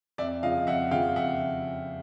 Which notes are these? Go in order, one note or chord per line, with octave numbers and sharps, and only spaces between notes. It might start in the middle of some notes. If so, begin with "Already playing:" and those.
F2 D5 E5
C#3 F3 D#5 F5
F2 E5 F#5
C#3 F3 F5 G5
F2 E5 F#5